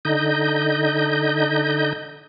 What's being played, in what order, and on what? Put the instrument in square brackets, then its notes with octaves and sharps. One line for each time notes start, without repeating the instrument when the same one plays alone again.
[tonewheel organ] D3 D#4 D#5 G6